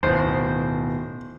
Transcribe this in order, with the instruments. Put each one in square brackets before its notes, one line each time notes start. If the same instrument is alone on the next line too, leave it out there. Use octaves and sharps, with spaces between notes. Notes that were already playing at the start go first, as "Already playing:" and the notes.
[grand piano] D1 [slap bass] B2 D#3 [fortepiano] C5